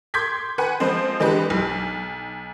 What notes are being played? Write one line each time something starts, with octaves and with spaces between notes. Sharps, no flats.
C6 D6 G6 G#6 B6
B4 F#5 G#5
F3 G#3 C4 C5
E3 G#3 D4 G4 B4
B1